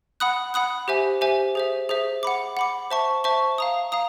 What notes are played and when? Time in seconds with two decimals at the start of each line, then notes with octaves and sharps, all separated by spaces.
0.20 F#5 B5 D#6 F#6
0.54 F#5 B5 D#6 F#6
0.88 G4 C5 E5 G#5
1.21 G4 C5 E5 G#5
1.55 G#4 C5 E5
1.89 G#4 C5 E5
2.23 F#5 B5 D6
2.57 F#5 B5 D6
2.91 C5 E5 A5 C#6
3.24 C5 E5 A5 C#6
3.58 F5 A#5 D#6
3.92 F5 A#5 D#6